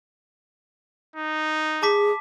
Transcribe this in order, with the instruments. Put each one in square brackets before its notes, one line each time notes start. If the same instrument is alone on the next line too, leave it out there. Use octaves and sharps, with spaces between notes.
[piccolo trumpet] D#4
[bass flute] G#4 [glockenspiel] A5 D6 B6